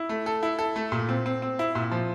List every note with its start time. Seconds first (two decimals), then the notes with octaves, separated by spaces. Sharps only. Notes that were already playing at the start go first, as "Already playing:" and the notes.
Already playing: E4
0.09 A3
0.26 A4
0.43 E4
0.59 A4
0.76 A3
0.92 A#2
1.09 C4
1.26 C4
1.42 C4
1.59 E4
1.75 A#2
1.91 F3